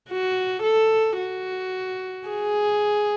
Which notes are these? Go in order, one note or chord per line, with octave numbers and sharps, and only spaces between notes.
F#4
A4
F#4
G#4